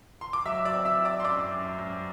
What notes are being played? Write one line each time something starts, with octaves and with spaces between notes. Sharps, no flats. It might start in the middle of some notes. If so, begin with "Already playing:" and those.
C6
D6
F#3 E5 E6
D5 D6
C4
E5 E6
E4
D5 D6
C6
F#2 D5 D6
F#2
F#2